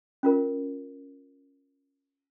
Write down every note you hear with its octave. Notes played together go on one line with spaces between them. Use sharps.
C#4 F4 A#4